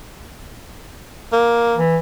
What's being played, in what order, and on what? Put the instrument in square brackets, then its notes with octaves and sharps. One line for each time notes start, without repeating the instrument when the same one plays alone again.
[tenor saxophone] A#3
[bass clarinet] E3